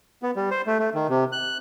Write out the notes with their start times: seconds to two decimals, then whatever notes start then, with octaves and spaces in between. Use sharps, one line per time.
0.23 B3
0.36 G3
0.51 C5
0.67 A3
0.80 A3
0.94 D#3
1.09 C3
1.32 F#6